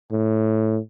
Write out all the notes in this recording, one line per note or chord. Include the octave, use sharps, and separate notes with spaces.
A2